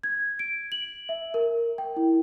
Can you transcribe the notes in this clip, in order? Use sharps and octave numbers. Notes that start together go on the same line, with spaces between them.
G#6
D7
F#7
E5
A#4
G5
E4